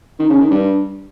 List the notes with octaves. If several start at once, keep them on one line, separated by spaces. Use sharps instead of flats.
D#3
C#3
D#3
G2